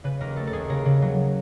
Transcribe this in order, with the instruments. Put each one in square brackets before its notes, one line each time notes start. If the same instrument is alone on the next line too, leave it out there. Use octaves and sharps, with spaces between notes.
[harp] C#3 B4
D#2 A#4
A3 A4
A4
D#2 G#4
C#3 A#4
C#3
F#3